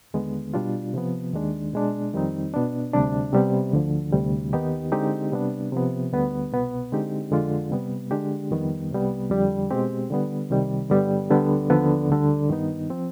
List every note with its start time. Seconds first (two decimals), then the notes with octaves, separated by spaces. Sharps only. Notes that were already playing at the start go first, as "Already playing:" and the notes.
0.14 D#2 D3 G#3 B3
0.54 B2 G3 D4 F4
0.94 C3 F3 B3
1.34 D#2 D#3 G#3 D4
1.73 B2 G#3 D4
2.14 F2 D#3 G3 C4 D#4
2.54 B2 B3 D4
2.93 D2 C3 G3 D4
3.33 C3 G3 B3
3.73 D2 D3 F3
4.13 D2 C3 G3
4.53 D#2 D#3 B3 D#4 G4
4.92 D3 G#3 C4 D#4 G4
5.32 C3 G3 B3 D4
5.72 C3 F3 B3
6.12 D2 D3 G3 B3
6.52 C2 B2 B3
6.92 D3 G#3 C4 D#4 G4
7.31 F2 D3 G#3 D4 F4
7.71 C3 G3 B3
8.11 D3 G#3 D4 G4
8.51 F2 D#3 G3 B3
8.91 C2 C3 G3 B3
9.30 F2 D3 G3
9.70 B2 G#3 C4 G4
10.10 D3 G3 B3
10.50 C2 C3 D#3 G3
10.90 G2 D3 G3 B3
11.30 D2 D3 G3 B3
11.70 D#2 D3 F3 B3
12.10 D2 D3 G3
12.50 G2 D#3 B3 D#4
12.90 F3 C4